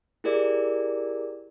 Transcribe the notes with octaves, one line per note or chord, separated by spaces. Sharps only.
E4 G4 G#4 A#4 D5